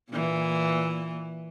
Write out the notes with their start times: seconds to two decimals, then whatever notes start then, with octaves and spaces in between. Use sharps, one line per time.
0.11 A#2 E3